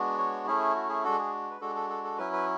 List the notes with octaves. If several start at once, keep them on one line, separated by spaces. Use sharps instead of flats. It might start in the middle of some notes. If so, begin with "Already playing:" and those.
Already playing: G#3 B3 D4 F#4
C#5
A3 C#4 E4 G#4
F#4
G#4
G#3 D4 F#4 A4
G#4
B4
G#3 D4 F#4 A4
A4
A4
A4
F#3 C#4 E4 B4
B4